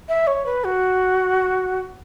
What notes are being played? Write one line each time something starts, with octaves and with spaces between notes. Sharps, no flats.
E5
C#5
B4
F#4